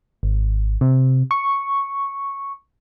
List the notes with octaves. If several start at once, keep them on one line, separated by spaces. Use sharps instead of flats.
G#1
C3
C#6